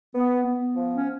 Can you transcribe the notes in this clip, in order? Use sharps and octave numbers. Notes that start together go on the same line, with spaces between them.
B3
B3
F3
C#4